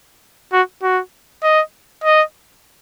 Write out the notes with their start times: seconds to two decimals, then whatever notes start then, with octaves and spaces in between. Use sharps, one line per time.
0.53 F#4
0.82 F#4
1.43 D#5
2.04 D#5